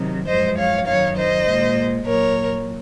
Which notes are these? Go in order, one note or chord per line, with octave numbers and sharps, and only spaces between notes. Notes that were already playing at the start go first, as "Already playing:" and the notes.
Already playing: C3 D#3 F#3
F#2 F3 G#3 C5 D#5
C#5 F5
F#2 D#3 F#3 C#5 F5
C5 D#5
A#2 G#3
A#2 F#3 A#4 C#5